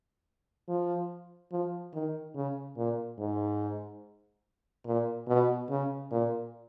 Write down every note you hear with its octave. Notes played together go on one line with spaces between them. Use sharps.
F3
F3
D#3
C#3
A#2
G#2
A#2
B2
C#3
A#2